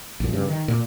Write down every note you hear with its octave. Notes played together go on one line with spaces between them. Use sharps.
A#1 F#2
G2 C#3
D#3
A#2